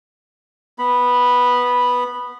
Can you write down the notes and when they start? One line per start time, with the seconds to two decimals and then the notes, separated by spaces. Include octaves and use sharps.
0.79 B3 B5